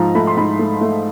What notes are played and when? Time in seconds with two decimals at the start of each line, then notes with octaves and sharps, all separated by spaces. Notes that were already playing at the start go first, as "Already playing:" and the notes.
Already playing: G#2 F3 A#5
0.15 A3 B5
0.27 C6
0.37 G#2 B5
0.59 A3
0.81 A3